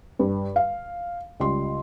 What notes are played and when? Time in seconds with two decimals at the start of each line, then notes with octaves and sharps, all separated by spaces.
0.19 G2
0.56 F5
1.40 C#2 G3 C6